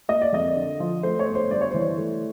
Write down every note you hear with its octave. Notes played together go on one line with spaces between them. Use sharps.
A#3 D#5
D5
F2 D#5
D3
F3
A3 C5
C#5
G1
C5
G2 D5
C#5
E3 C5
C#5
A3